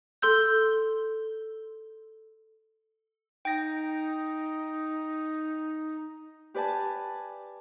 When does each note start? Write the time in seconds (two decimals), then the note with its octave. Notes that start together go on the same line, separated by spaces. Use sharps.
0.22 A4 C6 E6 G6
3.45 D#4 G5 A#6
6.54 G4 B4 D5 G#5 A5